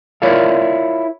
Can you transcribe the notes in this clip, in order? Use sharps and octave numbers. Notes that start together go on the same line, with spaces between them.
E4 F4 A#4 C#5 D5 F5